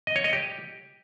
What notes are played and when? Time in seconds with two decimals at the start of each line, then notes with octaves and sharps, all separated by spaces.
0.07 D#5
0.16 C#5
0.24 D#5
0.33 G4